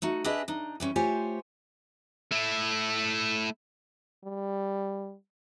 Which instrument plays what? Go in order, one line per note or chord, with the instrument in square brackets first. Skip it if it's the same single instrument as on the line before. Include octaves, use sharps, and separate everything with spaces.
[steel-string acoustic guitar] A3 D#4 F#4
D4 G4 G#4 B4 D#5 E5
D4 D#4
E3 G3 C#4
A3 F4 G4 C5 C#5 G#5
[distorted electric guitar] A3 E4
[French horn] G3